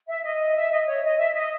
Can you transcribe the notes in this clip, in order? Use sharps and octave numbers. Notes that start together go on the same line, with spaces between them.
E5
D#5
E5
D#5
C#5
D#5
E5
D#5